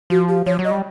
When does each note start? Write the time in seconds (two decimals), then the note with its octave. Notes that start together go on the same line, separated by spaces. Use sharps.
0.10 F3 F#4
0.28 G4
0.46 F3 C#5
0.59 F#3
0.64 D#5
0.71 G3